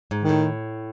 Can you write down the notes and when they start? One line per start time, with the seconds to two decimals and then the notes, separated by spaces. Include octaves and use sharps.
0.11 G#2
0.23 D#3
0.29 A2